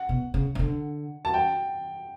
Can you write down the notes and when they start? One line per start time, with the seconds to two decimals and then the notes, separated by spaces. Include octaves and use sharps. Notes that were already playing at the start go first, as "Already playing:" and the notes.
Already playing: F#5
0.09 B2
0.34 C#3
0.55 C#3
0.59 D3
1.25 A5
1.34 G5